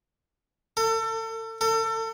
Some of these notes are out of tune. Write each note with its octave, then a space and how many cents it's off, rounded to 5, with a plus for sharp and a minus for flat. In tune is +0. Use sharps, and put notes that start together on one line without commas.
A4 +35
A4 +35